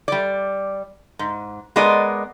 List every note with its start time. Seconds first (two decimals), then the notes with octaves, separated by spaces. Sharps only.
0.08 G3 D5
1.19 G#2
1.76 G#3 B3 A#4 D5 D#5